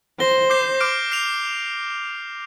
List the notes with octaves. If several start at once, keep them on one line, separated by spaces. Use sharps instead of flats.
C5 A#6 G7
D6 G6 C7
D6 F6 D7
F6 C7 F7